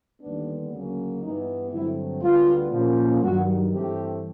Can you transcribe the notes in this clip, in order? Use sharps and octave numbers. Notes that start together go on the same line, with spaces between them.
D#2 D3 G3 B3 D4
D2 C#3 F#3 A#3 C#4
G2 E3 G3 B3 D#4
G2 D3 F#3 A3 C4 E4
D2 D3 G3 B3 F4
A#2 F3 A#3 C#4
G2 D#3 F#3 F#4
G2 E3 A3 C4 G4